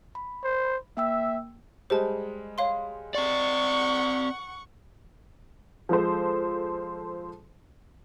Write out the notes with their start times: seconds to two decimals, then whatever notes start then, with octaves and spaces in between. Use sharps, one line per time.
0.15 B5
0.44 C5
0.97 A#3 E5 G5 E6
1.90 G3 G#3 C5 A5
2.58 C#5 F5 C6
3.15 C4 D5 F#5 C#6
5.89 F3 G#3 A4 C5